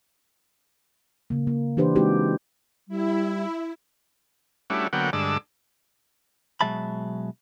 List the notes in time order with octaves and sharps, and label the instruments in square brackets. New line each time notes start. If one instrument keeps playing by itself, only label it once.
[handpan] C#3 A#3
A#3
E3 D4 G4 B4 C5
G#3 C4 D#4 E4 F#4 G4
[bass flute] G3 [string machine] E4
[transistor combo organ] G3 A3 C#4 D4 E4 F#4
D3 F#3 A#3 B3 F#5 G5
G2 D3 G#3 D5 A5 E6
[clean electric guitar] B2 F#3 G#3 E5 A5 B5